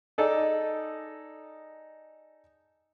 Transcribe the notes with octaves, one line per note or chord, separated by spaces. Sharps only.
D#4 G#4 A4 D5 D#5